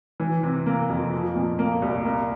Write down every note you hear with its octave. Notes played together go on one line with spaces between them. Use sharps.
E3
C3
A#3
F2
F3
A#2
A#3
C2
A#3